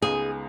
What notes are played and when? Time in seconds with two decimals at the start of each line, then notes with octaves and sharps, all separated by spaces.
0.02 C#2 C#3 G#3 B3 D#4 G#4